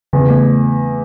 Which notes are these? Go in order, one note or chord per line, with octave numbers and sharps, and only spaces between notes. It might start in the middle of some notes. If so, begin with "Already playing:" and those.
E2 C#3
A3